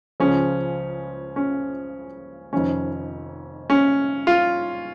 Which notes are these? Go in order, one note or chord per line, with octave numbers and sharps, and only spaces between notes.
C#2 C#3 F3 C#4
C#4
F1 F2 D#3 C#4
C#4
F4